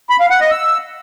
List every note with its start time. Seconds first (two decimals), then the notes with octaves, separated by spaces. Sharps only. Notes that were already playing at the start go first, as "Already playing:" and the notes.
0.10 B5
0.20 F5
0.30 F#5
0.41 D#5
0.51 E6